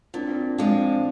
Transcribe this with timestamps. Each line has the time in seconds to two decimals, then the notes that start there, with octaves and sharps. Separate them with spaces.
0.14 A#2 C4 D4
0.58 F3 G#3 C4 D4